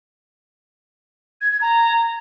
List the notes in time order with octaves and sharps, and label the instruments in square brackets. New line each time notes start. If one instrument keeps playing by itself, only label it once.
[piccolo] G#6
G#6
A#5